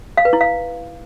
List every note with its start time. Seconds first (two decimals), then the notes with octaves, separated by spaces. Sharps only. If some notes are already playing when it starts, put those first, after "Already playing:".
0.17 F5
0.25 B4
0.33 E4
0.41 F5